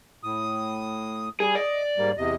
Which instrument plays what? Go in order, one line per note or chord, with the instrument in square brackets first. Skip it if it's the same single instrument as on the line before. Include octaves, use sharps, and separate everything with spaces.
[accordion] A2 D#6
[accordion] G3 [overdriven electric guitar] G#4
[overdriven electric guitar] D5 [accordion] D#5
[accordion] G#2 G3 A#3
E2 C3 D#5